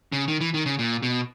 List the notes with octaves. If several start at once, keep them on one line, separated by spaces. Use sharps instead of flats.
C#3
D#3
E3
D#3
C#3
A#2
B2